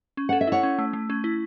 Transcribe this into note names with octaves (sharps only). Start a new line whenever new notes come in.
C#4
A4 F#5
E5
E4 C#5 F#5
C#4
A3
A3
C#4
E4